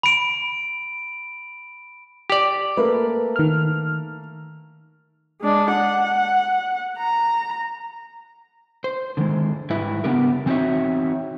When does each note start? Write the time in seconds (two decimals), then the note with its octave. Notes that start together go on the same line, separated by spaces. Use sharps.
0.03 B5 D7
2.30 G4 D5
2.77 A3 A#3 B4
3.36 D#3 F6
5.41 G#3 D4
5.72 F#5
6.99 A#5
8.84 C5
9.17 D3 D#3 G#3
9.70 G#2 G3 E4 B4 E5
10.04 C#3 B3 D4 G4 A#4
10.46 E3 C4 D#4 F#4 C#5 E5